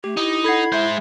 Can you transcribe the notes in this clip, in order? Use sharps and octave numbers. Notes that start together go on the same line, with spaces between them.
A3 G4
D#4 E4 D#6
A4 F#5 B5 G#6 C7
G#3 C5 E5 G6